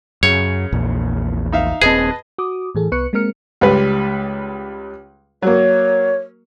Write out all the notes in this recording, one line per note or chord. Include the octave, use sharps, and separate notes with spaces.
F#2 C#3 C#5
A#1 E2 A#2
D#4 E5 F5
D#1 C4 G#4 B4 D#5 A5
F#4 D6 D#6
A2 E3 G#4 A4
C2 B3 B4 C#6 F#6 C#7
G#3 A#3 C4 A#4 F6 C#7
C#2 G3 B4
F#3 A#3 C#5